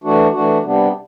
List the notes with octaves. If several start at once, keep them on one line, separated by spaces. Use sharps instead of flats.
E3 A3 D4 F#4
E3 A3 D4 F#4
C3 G3 B3 D4